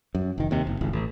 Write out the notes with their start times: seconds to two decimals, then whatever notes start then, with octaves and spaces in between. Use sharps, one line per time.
0.15 F#2
0.38 F1 D#3
0.51 D#2 C3
0.67 F#1
0.81 D#1 G#1 C#2
0.93 A1